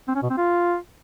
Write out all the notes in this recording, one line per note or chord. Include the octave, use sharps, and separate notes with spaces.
C4
C#4
B2
C4
F4